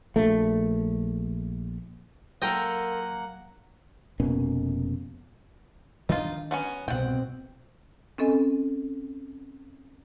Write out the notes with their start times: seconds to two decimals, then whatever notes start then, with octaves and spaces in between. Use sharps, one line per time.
0.16 A#1 A3
2.42 F#3 A#3 F4 A4 A#4 D#5 F#5 G5
4.20 F1 B2 A#3 C#4
6.09 D#3 G#3 D4 D#4 F4
6.51 F#3 B3 C#4
6.88 C2 G#2 B2 C4 F#5 G5
8.18 C4 C#4 A4 D#5 G#5